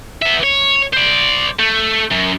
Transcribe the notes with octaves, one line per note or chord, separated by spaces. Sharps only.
B3 E5
C#5
C5 D5
A3
F#2